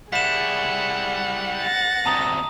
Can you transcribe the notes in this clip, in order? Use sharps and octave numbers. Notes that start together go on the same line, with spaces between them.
G3 E4 G#4 F#5 B6 E7
A6 A#6
D2 C3 A5 A#5 D#6